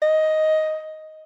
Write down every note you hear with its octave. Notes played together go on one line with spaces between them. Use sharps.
D#5